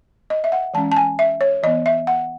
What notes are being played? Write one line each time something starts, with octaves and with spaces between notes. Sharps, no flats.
D#5
E5
F#5
E3 G#3 C#4 A5
A5
G#5
E5
C#5
E3 B3 D#5
E5
F#5